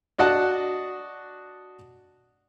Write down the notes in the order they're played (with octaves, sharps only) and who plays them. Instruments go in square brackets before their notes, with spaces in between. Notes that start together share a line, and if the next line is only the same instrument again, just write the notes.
[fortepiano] D4 F#4 D#5 F#5 A5